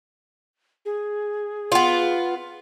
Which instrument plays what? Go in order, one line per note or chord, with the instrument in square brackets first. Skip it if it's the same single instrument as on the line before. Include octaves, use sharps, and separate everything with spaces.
[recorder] G#4
[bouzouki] B3 F4